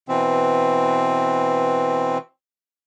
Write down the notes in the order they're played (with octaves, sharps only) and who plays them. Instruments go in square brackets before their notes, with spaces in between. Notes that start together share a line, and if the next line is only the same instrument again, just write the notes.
[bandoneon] B2 E3 C4